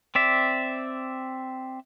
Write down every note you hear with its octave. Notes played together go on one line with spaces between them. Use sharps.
C4 D5 E5